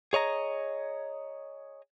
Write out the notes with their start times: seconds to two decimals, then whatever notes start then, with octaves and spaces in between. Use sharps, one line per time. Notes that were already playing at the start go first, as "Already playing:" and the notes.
0.13 G#4 C#5 D#5 A#5